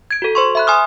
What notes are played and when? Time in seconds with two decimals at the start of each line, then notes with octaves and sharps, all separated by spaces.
0.11 G#6 D7
0.22 F#4 A4
0.35 C5 C6 C#6
0.55 E5 B5 F#6
0.67 G#5 C6 D#6 F6